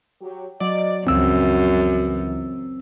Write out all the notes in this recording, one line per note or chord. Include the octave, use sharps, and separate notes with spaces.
F#3 G4
F#3 D5 D#5
C#2 F#2 E3 F3 C4 F#4 E6